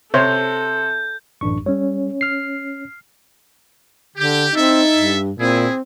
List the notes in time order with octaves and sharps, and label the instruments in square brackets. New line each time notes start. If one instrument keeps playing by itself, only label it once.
[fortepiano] C3 [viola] A4 [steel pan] C5 C#5 [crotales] G6
[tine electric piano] A1 D4 C#6 [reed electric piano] F#2
[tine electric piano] G3 [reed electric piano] C#4 C#5
[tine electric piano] F6 C7
[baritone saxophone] D3 [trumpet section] G4
[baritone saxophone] C4 [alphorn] D#4 [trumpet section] E4 A4 E5
[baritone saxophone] G2
[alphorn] A#2 [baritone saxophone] C4 [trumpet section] E4 G#4